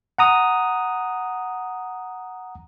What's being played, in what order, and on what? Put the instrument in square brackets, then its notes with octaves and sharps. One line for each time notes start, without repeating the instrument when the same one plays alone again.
[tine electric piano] F#5 A#5 D#6